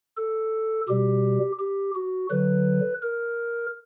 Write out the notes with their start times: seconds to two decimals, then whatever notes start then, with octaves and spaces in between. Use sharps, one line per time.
0.17 A4
0.88 B2 G3 G4
1.59 G4
1.95 F#4
2.30 D3 F#3 B4
3.02 A#4